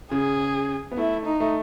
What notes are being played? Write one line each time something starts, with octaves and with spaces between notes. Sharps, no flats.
C#3 G#4
B3
A3 E4
D#4
A3